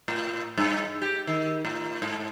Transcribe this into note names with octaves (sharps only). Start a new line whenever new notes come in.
A2
G2
G4
D#3
A2
G#2